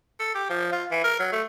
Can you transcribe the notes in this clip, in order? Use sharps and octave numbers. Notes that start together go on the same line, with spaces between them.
A4
G4
F3
F4
E3
A#4
F#3
A3